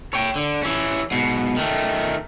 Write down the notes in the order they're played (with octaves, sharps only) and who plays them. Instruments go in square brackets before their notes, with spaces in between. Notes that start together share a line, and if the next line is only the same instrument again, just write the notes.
[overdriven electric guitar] C#5 G5
D3
E3 C#4
G#2 B2
D#3 A3